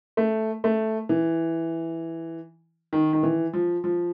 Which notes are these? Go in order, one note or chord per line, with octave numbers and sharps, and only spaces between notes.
A3
A3
E3
D#3
D#3
E3
F3
F3